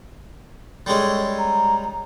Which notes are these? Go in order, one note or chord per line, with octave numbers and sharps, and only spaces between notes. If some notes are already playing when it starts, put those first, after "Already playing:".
G3 G#3 C#4 A4
A#5